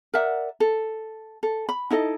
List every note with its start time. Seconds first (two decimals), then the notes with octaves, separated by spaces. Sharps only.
0.14 A#4 D5 E5 F#5
0.60 A4
1.43 A4
1.69 B5
1.90 D#4 E4 A4 D#5